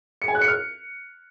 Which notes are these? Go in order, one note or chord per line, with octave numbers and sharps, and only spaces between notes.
C#7
G#5
F#6
C#7
F6